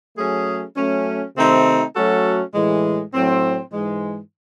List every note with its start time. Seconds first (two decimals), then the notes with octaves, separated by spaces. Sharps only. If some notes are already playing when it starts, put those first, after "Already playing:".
0.16 F#3 A3 C#4 G#4
0.76 F#3 A3 C#4
1.35 C3 D#3 A3 C4 D#4
1.94 F#3 A3 C#4 F#4 A4
2.54 A2 E3 G#3
3.13 A2 F#3 C4
3.72 G#2 E3 G#3